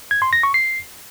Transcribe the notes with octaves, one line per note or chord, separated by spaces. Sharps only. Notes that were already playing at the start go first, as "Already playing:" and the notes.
G#6
C6
A#6
C#6
C7